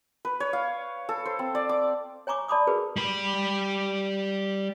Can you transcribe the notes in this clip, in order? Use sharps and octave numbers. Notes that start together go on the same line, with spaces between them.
B4
C#5
F5
A4
C5
C4
D5
D6
C#5 G#5 A#5 C#6 D6
D5 A5 B5 C6 D6 D#6
F#4 G#4 A#4 B4
G3 B5